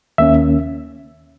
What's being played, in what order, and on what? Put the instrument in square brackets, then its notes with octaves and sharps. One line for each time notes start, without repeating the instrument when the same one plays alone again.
[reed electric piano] D#2 D#3 A#3 C#4 E5